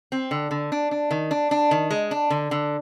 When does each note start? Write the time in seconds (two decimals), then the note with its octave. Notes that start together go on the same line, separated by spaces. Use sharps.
0.12 C4
0.31 D3
0.51 D3
0.72 D4
0.91 D4
1.11 D#3
1.31 D4
1.51 D4
1.71 D#3
1.91 G#3
2.11 D4
2.30 D3
2.51 D3